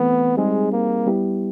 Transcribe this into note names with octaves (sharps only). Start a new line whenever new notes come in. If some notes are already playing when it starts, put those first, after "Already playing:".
Already playing: E3 A3 B3 C4
G3 G#3 C4 D#4 G#4
A#3
G3 B3 E4 G4